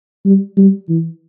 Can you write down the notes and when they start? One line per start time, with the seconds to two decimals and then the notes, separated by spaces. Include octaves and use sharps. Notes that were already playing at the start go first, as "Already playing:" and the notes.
0.25 G3
0.57 G3
0.89 E3